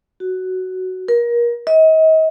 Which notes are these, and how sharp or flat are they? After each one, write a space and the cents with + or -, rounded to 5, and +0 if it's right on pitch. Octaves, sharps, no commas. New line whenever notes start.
F#4 +10
A#4 +30
D#5 +35